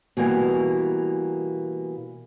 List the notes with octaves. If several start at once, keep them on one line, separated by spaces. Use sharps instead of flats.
B2 E3 G3 A#3 E4 G#5